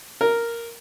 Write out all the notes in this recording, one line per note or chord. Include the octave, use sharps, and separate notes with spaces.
A#4